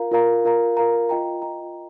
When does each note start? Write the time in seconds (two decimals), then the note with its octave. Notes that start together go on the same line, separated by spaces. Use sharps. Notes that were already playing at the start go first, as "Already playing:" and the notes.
Already playing: F4 A#4 F5 A#5
0.11 F4 A#4 F5 A#5
0.45 F4 A#4 F5 A#5
0.77 F4 A#4 F5 A#5
1.09 F4 D#5 G5 A#5
1.42 F4 D#5 G5 A#5